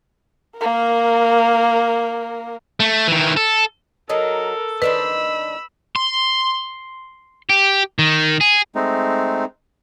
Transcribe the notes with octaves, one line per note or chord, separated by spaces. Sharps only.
A#3 A#4
A3
D#3 E3
A4
F#3 D#4 A4 A#4
D#3 D4 B4 C5 B5 E6
C6
G4
D#3
G#4
G#3 A3 C4 D#4